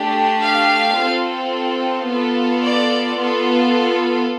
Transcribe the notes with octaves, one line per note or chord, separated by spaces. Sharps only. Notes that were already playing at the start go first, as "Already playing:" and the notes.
Already playing: A3 D4 G4
F5
C4 F4 A4
B3 F4 A4
D5
B3 F4 A4